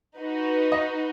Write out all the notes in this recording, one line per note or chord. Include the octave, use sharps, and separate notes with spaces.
D#4 F#4 B4
D#5